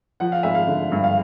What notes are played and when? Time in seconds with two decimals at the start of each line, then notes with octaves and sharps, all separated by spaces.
0.20 F3 F#5
0.32 F5
0.43 G#1 E5
0.55 F5
0.68 D3
0.92 G2
1.04 F5